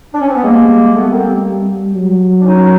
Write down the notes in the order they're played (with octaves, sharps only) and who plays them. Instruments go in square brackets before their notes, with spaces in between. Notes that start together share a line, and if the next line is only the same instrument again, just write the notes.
[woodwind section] D4
C#4
C4
B3
[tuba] G3 [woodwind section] G#3 A#3
[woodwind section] A3 B3
A#3 C4
[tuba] F#3
[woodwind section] D4
C#4 D#4